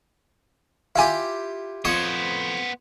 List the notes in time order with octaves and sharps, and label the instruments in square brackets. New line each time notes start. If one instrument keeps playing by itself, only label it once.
[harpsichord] E4 F4 G4 [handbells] F5 G#5
[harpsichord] F2 C#5 D#6 [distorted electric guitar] B3 C5